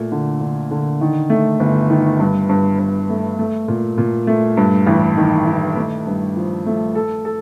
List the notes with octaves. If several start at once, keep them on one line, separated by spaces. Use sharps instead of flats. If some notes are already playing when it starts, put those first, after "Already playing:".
Already playing: A#2 A3
D3
D3
D3
D#3
A3
G1
D#3
G2
G2
G2
A3
A3
A#2
A#2
A3
G2
A1
D#3
D#3
A3
G2
F3
A3
A4
A4